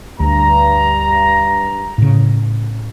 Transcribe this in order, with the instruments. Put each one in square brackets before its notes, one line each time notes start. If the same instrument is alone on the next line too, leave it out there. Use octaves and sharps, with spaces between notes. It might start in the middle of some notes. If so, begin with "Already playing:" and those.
[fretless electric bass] D2 [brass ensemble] G2 A#5
[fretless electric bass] A2 C#3